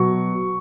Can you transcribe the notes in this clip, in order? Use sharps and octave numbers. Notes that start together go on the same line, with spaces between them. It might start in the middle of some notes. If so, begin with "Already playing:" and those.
Already playing: B2 F#3 C#6